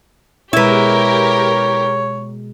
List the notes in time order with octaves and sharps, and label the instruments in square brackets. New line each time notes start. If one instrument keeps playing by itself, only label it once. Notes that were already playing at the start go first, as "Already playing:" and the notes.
[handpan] B2 G#3 [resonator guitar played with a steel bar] E4 B4 [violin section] G4 A#4 [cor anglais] C#5